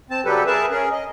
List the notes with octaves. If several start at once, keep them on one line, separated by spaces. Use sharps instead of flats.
C4 A5
C#3 F#3 G3 G4 A4 B4
G#4 A#4 B4 E5 A5
C#4 G#4 A#4
D#5